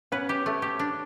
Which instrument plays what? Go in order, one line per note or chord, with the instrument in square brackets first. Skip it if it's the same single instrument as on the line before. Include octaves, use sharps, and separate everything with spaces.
[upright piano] B3 C#4 [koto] B4
[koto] G4
A3
G4
D4